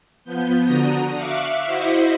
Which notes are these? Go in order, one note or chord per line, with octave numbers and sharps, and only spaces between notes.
F3 B3 G6
D3 D4 F#4 A#5 D#6
E5 F5 C#6 D6 F#6
E4 F#4 C5 D#5 E5 F#5